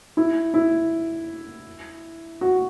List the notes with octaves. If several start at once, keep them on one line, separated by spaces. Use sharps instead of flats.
E4
E4
F#4